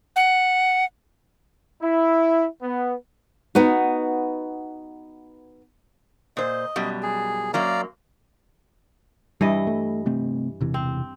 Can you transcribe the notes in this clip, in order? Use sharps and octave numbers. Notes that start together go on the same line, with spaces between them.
F#5
E4
B3
B3 D#4 F#4
A#2 C5 D#5
F#2 B2 G3
G#4
F#2 F#3 A#3 D5 F5 A#5
G2 E3 G3 D#5
A3
C3 A3 C4
E1 C3 E3
C4